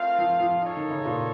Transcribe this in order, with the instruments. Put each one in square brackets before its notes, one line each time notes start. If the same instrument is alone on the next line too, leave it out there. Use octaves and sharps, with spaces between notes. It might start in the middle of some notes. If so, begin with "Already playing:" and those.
Already playing: [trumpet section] A3 C4 F4 A#4 F5
[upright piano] F3
F3
[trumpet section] D#4 A4 C#5
[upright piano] D#3
C#3
A#2